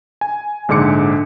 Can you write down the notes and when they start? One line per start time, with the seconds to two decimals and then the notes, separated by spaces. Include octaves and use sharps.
0.21 G#5
0.68 A#1 G#2 D3 D6 C#7